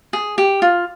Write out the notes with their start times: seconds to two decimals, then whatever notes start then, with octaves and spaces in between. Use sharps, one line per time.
0.13 G#4
0.38 G4
0.62 F4